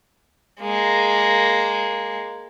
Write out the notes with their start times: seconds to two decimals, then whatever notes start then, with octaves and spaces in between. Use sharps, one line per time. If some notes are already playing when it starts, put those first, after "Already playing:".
0.61 G#3 A#3